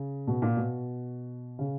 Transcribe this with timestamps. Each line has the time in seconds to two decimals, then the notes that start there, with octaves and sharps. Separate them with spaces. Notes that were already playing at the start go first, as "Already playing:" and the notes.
Already playing: C#3
0.27 B2
0.42 A#2
0.57 B2
1.59 C#3